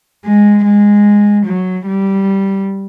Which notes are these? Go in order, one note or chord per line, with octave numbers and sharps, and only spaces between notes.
G#3
G#3
F#3
G3